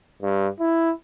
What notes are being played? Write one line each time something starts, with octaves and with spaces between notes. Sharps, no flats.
G2
E4